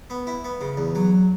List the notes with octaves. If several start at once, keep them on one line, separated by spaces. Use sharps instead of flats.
B3
E4
B3
C#3
E2
F#3